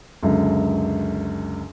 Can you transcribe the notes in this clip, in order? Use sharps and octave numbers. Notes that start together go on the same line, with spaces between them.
C#2 F#2 D3